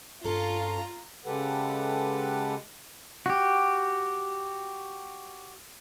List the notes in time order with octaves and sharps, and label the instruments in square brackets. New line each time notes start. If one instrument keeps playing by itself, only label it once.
[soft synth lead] G2 [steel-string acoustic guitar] C#4 A4 [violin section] F4 [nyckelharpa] A#5
[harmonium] C#3 G#3 G4 A4 B4 F#5
[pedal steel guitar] F#4 G4